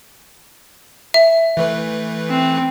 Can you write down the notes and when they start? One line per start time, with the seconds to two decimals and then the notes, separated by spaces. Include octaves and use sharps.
1.14 E5
1.57 E3 A3 B4
2.30 C4